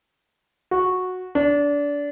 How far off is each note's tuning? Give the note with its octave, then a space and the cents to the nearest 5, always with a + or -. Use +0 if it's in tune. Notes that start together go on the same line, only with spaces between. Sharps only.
F#4 -10
D4 -25